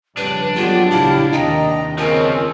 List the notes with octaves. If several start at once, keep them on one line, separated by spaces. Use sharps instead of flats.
F2 C#3 G3 D4 B4
D3 F3 F#3 G#3 B3 F4 G4
A1 C#3 E4 G4 F5 A5
D#2 C3 D#3 D#5 G5 A#5
C#3 F3 G#3 C4 C#4 A#4